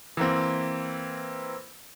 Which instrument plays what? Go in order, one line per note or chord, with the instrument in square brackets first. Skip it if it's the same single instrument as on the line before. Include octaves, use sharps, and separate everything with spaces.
[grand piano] E3 A#3 C4